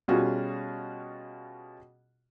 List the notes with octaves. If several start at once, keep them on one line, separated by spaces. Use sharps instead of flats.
B2 G3 C#4 F4 F#4 G#4